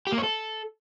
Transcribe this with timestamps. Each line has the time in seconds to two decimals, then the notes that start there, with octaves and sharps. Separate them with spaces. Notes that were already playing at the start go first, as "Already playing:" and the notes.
0.07 G4
0.12 A#3
0.18 C#5
0.23 A4